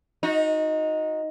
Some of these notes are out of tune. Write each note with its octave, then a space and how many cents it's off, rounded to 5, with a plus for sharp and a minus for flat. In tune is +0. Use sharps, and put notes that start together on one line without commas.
D#4 +5 F#4 -30